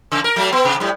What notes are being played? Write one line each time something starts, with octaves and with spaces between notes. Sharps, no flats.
C#3
A#4
F#3 A3
B3
C3
A2 G3